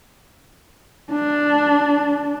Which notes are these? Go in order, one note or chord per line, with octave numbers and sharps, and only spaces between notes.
D4